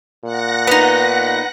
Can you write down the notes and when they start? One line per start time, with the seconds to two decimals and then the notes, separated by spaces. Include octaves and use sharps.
0.24 A#2 F#5 F#6 A#6
0.67 B3 D#4 B4